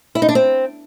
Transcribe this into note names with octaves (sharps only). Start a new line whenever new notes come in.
E4
D#4
D4
C4